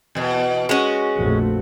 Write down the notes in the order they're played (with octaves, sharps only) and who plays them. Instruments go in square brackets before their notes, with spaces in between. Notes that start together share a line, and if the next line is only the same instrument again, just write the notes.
[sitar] E2 B2
[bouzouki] G#3 C#4 [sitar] F#4
[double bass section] A#1 F2 A3